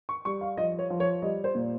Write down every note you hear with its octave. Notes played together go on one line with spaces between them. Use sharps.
C#6
G3 C#6
F5
F3 D#5
C#5
F3
C#5
G3 D#5
C5
A#2